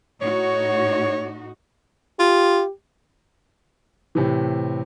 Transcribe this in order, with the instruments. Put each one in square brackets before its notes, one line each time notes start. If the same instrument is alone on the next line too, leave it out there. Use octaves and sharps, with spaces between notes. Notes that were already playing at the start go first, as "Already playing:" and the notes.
[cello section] A2 D#4 F#4 [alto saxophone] C#5
[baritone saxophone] F4 [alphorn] G4
[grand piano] A2 C3 E3